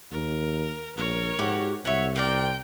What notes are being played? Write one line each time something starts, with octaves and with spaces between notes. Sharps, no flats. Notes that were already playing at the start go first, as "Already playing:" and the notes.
D#2 A#4
A#1 A#4 C#5
G#2 F#4 G4
C2 F#4 C#5 E5
C4 A#4 D5 G5